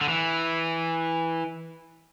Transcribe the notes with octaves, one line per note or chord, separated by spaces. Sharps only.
D3
E3